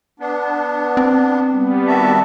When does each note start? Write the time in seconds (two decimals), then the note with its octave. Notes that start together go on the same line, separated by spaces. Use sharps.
0.20 B3 D4
0.97 C4
1.53 G3 B3
1.87 D#3 F#4 E5 A5